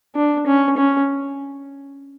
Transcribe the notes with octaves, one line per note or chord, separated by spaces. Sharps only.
D4
C#4
C#4